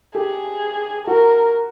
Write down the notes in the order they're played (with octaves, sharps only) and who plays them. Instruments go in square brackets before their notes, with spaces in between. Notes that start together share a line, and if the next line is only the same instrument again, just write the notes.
[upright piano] G4 [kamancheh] G#4
[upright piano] F#4 [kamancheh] A#4